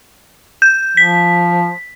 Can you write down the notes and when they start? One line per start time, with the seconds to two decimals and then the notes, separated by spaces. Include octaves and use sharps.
0.62 G6
0.97 F3 B6